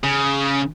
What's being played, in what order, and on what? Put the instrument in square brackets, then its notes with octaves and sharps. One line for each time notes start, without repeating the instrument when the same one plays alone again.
[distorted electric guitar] C#3